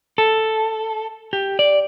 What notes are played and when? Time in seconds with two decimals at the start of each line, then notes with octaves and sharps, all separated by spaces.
0.18 A4
1.33 G4
1.59 D5